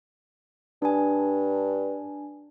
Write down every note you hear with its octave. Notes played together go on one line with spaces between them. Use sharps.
G2 D4 G#5